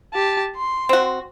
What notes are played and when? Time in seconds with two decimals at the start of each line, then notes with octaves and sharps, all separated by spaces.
0.14 G4 A5
0.56 C6
0.89 C4 F#4